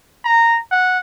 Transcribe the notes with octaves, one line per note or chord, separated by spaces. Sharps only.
A#5
F#5